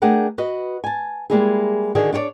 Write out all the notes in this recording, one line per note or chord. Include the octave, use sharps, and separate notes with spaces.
A3 D4 G#4 A#4 F#5 G5
F#4 B4 D#5
G#5 A5
G3 G#3 A#3 D#4 E4 G#4
D3 D#3 D4 F#4 G#4
D4 F4 G4 C#5 D5